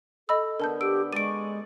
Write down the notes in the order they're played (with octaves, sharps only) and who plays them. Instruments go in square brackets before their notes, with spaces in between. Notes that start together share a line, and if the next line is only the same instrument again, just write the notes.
[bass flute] A4 [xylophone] D#5 B5 E6
[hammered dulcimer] D3 B3 [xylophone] A#4 A5 G6
[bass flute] G4 [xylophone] E6 D7
[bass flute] G#3 [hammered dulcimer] D5 C#6 [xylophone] D7 D#7